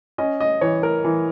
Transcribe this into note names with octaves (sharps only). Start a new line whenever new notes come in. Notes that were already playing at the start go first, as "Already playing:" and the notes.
C#4 D#5
D#5
E3 C#5
A#4
E3